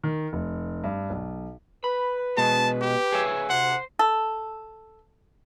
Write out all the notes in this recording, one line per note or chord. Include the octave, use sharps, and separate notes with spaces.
D#3
F1
G2
B1
B4 B5
B2 G#3 A5
G4
G#4 C#5 E5
D2 C3 C5 F#5
A4